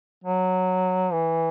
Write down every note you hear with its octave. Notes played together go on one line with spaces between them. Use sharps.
F#3
E3